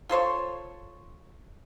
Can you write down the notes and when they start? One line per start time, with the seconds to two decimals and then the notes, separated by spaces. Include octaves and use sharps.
0.09 F4 A4 C5 C#5